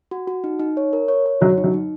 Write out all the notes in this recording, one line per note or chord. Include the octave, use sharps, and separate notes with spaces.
F#4
F#4
D#4
D#4
C#5
A#4
C#5
C#5
F#3 F#4
D#4
F#3
D#4